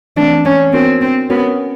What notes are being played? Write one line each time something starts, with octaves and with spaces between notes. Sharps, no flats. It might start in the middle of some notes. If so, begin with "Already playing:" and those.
E3 A3 C4 D4
C#4
B3 C4 D4 F#4 A#4
C4
B3 C#4 F#4 A#4 C#5